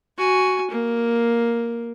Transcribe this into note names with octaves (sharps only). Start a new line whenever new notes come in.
F#4 G#5
A#3